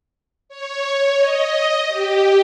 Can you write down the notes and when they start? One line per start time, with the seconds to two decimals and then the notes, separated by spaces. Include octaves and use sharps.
0.49 C#5
1.17 D#5
1.88 G4